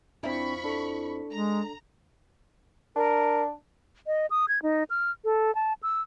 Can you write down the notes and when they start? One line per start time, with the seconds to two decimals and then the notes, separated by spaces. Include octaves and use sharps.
0.23 F2 C4 D4 E4 B5 C#6
0.64 D4 A4
1.31 G#3 A#5
2.96 D4 A#4
4.07 D#5
4.30 D#6
4.49 G#6
4.62 D#4
4.90 F6
5.25 A4
5.55 A5
5.83 E6